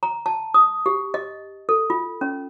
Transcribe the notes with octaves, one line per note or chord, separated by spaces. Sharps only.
A#5
A5
D#6
G4
D#5
A4
F4
C#4